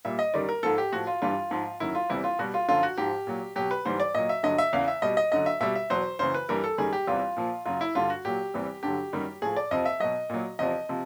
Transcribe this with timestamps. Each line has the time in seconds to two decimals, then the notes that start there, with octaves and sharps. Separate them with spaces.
0.05 A#2 G3 E5
0.19 D#5
0.34 F#2 D#3 G3 D5
0.49 A#4
0.63 G#2 F3 A4
0.78 G4
0.92 A2 F3 F#4
1.07 F4
1.22 G2 E3 G3 F4
1.51 G#2 F3
1.80 F#2 D#3 F#3 E4
1.95 F4
2.10 E2 C3 E3 G3 E4
2.24 F4
2.39 B2 G3 F#4
2.54 F4
2.68 F#2 D3 F3 F4
2.83 F#4
2.98 G#2 F3 G4
3.27 A#2 F#3
3.56 B2 F#3 G4
3.71 B4
3.85 G#2 E3 G3 C5
4.00 D5
4.15 A#2 F#3 D#5
4.29 E5
4.43 G2 D3 F#3 D#5
4.58 E5
4.73 E2 C#3 E3 F5
4.88 E5
5.02 B2 G3 D#5
5.17 D#5
5.32 F#2 D3 F#3 D#5
5.46 E5
5.60 B2 G3 E5
5.75 E5
5.90 E2 B2 F#3 C5
6.19 F#2 C#3 E3 C5
6.34 B4
6.49 G2 E3 G3 A#4
6.64 A4
6.78 F#2 D#3 G3 G#4
6.93 G4
7.07 E2 C3 E3 G3 F4
7.37 A#2 F3
7.65 F#2 C#3 F#3 F4
7.81 E4
7.95 G2 D3 G3 F4
8.10 F#4
8.25 A#2 F#3 G4
8.54 E2 C3 E3 G3
8.83 G2 D3 F#3 G4
9.13 F#2 D#3 G3
9.42 A2 F3 G#4
9.56 D5
9.71 F2 C3 F3 D#5
9.85 E5
10.00 B2 F#3 D#5
10.29 A#2 F#3
10.59 E2 C3 F3 D#5
10.89 C3 F3